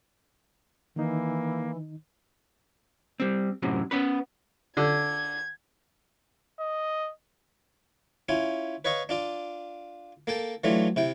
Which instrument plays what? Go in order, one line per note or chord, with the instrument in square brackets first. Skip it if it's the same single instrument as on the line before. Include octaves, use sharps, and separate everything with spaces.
[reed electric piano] D#3 D#4 [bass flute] E3 [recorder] A#3
[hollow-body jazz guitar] G3 C4
F#2 A2 C3 F#3
B3 C#4 B4
[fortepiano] D3 [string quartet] G#6
[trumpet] D#5
[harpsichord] C#4 E4 F4 G#5
B4 C#5 D#5 F5 C#6
D4 F4 D5
A#3 A4 G5 A5
E3 F#3 A3 D4 F4
C3 E4 G5